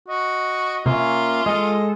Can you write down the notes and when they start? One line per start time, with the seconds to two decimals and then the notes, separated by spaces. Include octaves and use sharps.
0.08 F#4 D#5
0.86 C3 A#3 C#4 F4 E5
1.46 G#3 A4 D#5